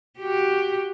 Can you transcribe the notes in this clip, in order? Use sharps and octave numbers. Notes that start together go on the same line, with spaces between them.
F#4 G4